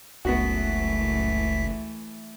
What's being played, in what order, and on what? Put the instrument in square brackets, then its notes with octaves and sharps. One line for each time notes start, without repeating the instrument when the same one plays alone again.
[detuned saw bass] F#1 [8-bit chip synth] C#2 B6 [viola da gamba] E3 A3 [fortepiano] B3 F#4